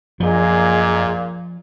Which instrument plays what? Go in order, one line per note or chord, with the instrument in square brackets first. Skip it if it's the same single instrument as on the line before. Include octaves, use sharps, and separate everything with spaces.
[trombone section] A#1 A#2 [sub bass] F#2 [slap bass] F3 [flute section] G#4 D#5